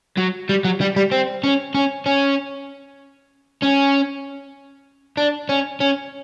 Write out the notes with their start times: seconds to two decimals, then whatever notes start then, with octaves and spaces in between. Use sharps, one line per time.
0.17 F#3
0.49 G3
0.65 F#3
0.81 G3
0.96 G3
1.12 C4
1.44 C#4
1.74 C#4
2.06 C#4
3.62 C#4
5.18 D4
5.49 C#4
5.80 C#4